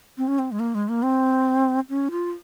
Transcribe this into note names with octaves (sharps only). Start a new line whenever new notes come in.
C4
C#4
C4
G#3
A#3
G#3
A#3
C4
C#4
F4